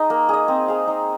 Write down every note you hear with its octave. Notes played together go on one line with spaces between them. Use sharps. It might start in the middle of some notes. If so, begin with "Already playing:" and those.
Already playing: D#4 G#4 D#5
A#3
G#4 D#5
C4
G#4 F5
D#4